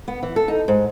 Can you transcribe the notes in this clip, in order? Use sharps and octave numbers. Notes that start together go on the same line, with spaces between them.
B3
E3
A4
D#4
G#2